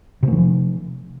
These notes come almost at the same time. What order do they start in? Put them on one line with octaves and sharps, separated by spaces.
C3 A3 D#3 F3